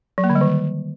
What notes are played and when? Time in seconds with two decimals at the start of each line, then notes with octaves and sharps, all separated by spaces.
0.18 F#3
0.24 A#3
0.30 D3
0.35 G3
0.41 D#3